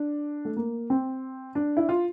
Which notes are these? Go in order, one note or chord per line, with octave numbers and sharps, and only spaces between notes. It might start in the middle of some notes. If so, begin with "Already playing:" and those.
Already playing: D4
A3
A#3
C4
D4
E4
F4